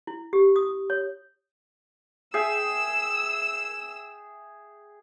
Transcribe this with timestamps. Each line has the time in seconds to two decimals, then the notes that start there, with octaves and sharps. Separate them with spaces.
0.07 E4
0.33 G4
0.56 D#6
0.90 C#5
2.34 G#4 E5 G5 E6